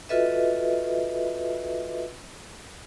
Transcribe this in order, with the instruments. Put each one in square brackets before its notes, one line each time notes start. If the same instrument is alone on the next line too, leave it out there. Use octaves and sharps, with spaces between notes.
[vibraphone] F4 F#4 A4 B4 D#5 E5